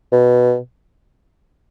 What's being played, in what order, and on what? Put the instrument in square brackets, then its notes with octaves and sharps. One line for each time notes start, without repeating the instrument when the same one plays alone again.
[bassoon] B2